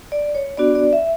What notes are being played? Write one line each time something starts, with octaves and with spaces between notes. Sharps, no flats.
D5
C#5
B3 D4 F#4 D5
D5
E5